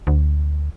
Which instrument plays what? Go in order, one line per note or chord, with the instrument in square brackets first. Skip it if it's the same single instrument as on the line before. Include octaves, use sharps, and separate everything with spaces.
[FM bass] D2